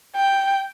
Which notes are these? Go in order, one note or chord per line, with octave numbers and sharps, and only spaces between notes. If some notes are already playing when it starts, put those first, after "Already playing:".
G5